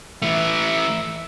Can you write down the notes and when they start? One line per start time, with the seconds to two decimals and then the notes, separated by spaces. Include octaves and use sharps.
0.22 E3 A3 E5